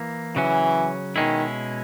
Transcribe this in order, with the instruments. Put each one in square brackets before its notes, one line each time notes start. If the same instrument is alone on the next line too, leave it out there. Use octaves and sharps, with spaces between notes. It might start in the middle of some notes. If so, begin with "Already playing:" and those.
Already playing: [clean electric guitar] E3 A#3
[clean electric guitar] C#3 F#3 C#4 [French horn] E3
[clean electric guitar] B2 G#3 C#4 E4 [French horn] D#3